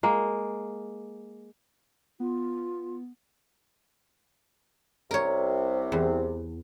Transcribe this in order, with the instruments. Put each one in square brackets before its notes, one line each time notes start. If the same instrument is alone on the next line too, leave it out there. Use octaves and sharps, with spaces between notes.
[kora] G#3 A#3
[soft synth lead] B3 [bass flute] F4
[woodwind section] C2 C3 [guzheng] A#4 C#5
[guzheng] E2